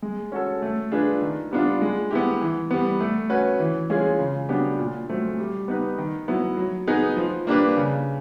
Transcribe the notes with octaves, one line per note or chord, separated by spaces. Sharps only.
G#3
C#4 F#4 A4
A3
D4 F4 G#4 B4
D#3
G3 B3 D4 F4
G#3
B3 E4 G4
E3
G3 B3
A3
C#4 F#4 B4
E3
G#3 C#4 F4 G#4
C#3
F#3 B3 D4 G4
A#2
F#3 A3 C4
G3
B3 D#4 G4 B4
D#3
F#3 B3 E4
F#3
B3 D#4 G#4 B4
F3
A#3 D4 G4 B4
C#3